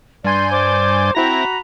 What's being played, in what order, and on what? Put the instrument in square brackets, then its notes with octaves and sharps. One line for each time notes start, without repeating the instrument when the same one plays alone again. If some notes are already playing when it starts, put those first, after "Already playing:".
[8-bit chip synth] G2 G#5 G6 [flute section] D5 C6
[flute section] C5 D5 D6
[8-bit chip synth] C4 E4 A#6 [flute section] F#4 A#5 B5